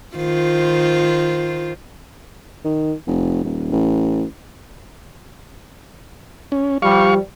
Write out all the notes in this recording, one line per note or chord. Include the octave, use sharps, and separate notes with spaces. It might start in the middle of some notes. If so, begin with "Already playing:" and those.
D#3 F4 C5
D#3
F1
D#1
A1
C#4
F3 G3 F5 C#6